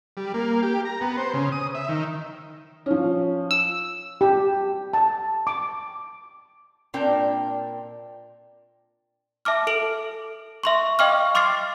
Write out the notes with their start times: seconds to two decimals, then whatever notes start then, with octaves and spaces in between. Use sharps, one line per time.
0.17 G3
0.34 A#3
0.63 G4
0.85 A#5
1.01 B3
1.17 C5
1.34 C#3
1.52 D#6
1.75 E5
1.89 D#3
2.86 F3 C#4
3.51 E6
4.21 G4
4.93 A5
5.47 D6
6.94 A#2 C4 D4 A#4 G5
9.45 E5 A5 D6 F6
9.67 A4 D7 F#7
10.63 E5 C6 C#6
10.99 D#5 F5 G5 C#6 D6 F6
11.35 C6 D6 F6 A6 C7